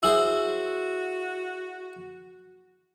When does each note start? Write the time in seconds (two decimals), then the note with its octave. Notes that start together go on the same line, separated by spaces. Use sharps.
0.03 E4 F#4 G#4 C5 E6 F#7